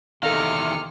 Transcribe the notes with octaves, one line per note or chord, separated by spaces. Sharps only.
E2 C3 D#3 A4 D#5 F5 F6 C#7